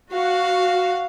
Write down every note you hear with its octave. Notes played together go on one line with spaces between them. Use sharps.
F#4 F5